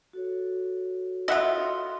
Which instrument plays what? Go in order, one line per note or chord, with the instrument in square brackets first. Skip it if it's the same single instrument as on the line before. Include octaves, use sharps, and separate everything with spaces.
[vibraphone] F#4 A4 C#5
[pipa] E4 F4 [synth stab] D#5 E5 F#5